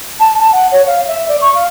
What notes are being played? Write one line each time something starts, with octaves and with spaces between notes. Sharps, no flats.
A5
A5
F#5
C#5
F5
E5
D5
C#6
F5